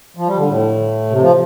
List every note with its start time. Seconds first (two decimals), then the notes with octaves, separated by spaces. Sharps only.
0.17 F3
0.27 G3
0.38 D3
0.48 A2
1.10 C3
1.21 F3